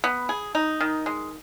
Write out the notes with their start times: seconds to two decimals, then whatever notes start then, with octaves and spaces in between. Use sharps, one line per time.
0.04 B3
0.29 G#4
0.55 D#4
0.81 D#3
1.06 G#3